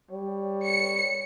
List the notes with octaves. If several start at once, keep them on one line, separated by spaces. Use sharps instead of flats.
G3 C#5
C#7